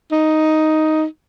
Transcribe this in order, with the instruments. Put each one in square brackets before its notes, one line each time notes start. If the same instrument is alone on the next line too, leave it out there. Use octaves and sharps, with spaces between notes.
[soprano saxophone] D#4